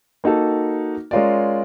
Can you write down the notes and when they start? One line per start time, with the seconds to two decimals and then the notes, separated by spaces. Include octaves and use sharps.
0.24 A#3 D#4 F#4 A4
1.11 G#3 C#4 F4 A#4 D5